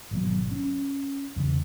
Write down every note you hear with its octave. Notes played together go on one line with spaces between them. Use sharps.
G#1 B2 F#3
C#4
E2 C#3